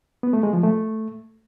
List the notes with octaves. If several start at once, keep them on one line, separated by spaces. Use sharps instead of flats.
B3
A3
G#3
F3
A3